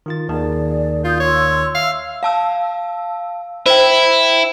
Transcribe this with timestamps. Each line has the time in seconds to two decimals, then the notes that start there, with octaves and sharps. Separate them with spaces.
0.06 D#3 F4 A6
0.29 D#2 D#3 G#4 D5 A5
1.05 F4 D#6 G6
1.20 C#5 C6 E6
1.75 E5 F5 E6
2.23 F5 A5 E6
3.66 E4 C5 G5